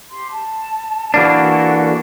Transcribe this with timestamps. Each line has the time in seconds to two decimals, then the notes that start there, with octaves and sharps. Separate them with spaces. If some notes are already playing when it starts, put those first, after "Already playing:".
0.10 G4 C6
0.32 A5
1.14 E3 A#3 D4 F#4 A4 F#5